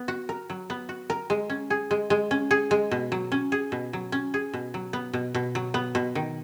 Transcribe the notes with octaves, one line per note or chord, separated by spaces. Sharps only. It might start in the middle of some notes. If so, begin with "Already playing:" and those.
Already playing: B3
F#4
A#4
F#3
B3
F#4
A#4
G#3
C#4
G#4
G#3
G#3
C#4
G#4
G#3
B2
F#3
C#4
G#4
B2
F#3
C#4
G#4
B2
F#3
B3
B2
B2
F#3
B3
B2
D#3